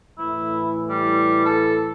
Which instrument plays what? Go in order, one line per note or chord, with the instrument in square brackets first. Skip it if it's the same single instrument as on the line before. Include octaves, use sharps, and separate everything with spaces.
[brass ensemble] A2 E3 [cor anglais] E4
[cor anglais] G3
A4